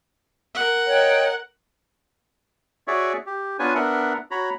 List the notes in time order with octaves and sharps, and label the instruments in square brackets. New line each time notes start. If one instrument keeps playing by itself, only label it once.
[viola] A#4 F#5
[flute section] C#5 D#5 G5
[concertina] F#4 G#4 C#5 D5 E5 C#6
G4
B3 D4 F4 B4 C#5 G#5
B3 D4 A#4 E5 F#5
F#4 C#5 A#5 B5